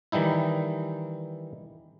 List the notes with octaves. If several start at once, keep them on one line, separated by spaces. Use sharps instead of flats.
D#3 E3 G3 D#4 E4